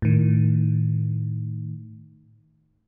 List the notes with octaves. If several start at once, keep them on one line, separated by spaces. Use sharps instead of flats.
A2 D#3